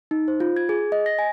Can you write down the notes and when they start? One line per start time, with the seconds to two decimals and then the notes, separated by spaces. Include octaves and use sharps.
0.11 D#4
0.28 C5
0.40 F4
0.56 G#6
0.69 G#4
0.92 D#5
1.06 A#6
1.19 G#5